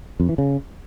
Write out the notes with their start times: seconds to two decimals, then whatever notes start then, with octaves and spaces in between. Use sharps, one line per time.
0.20 F2
0.29 E3
0.38 C#3